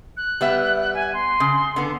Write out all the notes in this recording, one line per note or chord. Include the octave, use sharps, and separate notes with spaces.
F#6
G3 B3 E5
G#5
C6
C#3
D3 B3